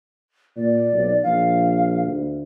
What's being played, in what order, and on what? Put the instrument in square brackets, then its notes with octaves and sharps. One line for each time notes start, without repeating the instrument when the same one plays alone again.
[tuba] A#2 [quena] D5
[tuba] B1
[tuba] A#1 [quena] F5
[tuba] D2